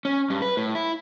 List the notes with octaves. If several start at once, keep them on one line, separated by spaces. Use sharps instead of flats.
C#4
G2
B4
A2
E4